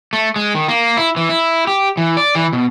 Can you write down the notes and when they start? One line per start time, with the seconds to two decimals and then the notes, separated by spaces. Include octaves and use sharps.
0.13 A3
0.36 G#3
0.55 D#3
0.68 A#3
0.97 E4
1.16 E3
1.29 E4
1.67 G4
1.97 E3
2.17 D5
2.35 E3
2.53 B2